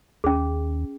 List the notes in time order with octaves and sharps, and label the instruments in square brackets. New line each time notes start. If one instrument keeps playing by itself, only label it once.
[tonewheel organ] D#2 [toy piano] C#4 G#4